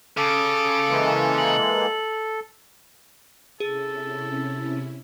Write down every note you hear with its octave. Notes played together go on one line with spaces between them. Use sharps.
C#3 A4 D6
E3 G#3 A#3
F#7
C3 C#4 E4 G#4 A4